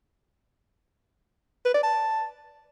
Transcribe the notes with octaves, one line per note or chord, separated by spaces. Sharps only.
B4
D5
A5